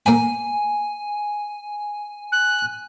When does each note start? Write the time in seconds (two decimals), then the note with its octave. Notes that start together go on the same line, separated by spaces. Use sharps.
0.06 A#3 G5 G#5 B5
2.32 F#6